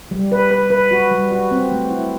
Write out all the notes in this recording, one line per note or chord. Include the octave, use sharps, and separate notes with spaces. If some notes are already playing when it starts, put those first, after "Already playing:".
G3
B4
B4
B4
F#4
G3
F#4
C4
A3
E4